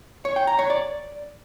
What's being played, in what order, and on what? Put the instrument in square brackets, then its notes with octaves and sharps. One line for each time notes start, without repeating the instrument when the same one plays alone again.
[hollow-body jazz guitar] C#5
G5
A#5
C#5
D5